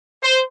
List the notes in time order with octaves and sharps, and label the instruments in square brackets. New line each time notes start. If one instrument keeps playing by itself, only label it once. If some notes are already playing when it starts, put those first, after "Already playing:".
[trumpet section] C5